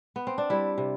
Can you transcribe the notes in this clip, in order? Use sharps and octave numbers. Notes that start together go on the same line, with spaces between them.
B3
C4
D4
G3 E4
C3